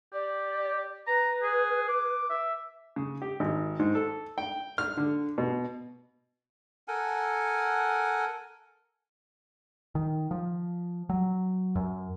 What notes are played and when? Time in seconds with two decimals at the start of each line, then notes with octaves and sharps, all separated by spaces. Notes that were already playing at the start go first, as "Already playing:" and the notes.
0.13 G4 D5
1.07 B4 A#5
1.42 G#4
1.89 D6
2.30 E5
2.96 C#3
3.22 G4
3.40 G#1
3.79 G#2
3.95 A4
4.38 G5
4.78 F6
4.97 D3
5.38 B2
6.88 A4 A#4 F#5 G#5
9.95 D#3
10.31 F3
11.09 F#3
11.75 F#2